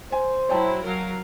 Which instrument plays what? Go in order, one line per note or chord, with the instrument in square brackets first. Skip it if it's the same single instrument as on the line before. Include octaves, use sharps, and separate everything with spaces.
[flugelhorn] C5 [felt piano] G#5
[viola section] F#3 E4 [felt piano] C#5 G5 A5
[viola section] F#3 A#4 F5